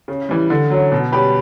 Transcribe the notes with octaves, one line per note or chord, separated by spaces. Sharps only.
C#3
E3 G3
D3
F#3 C#4
B2
G3 C#4 G4 B4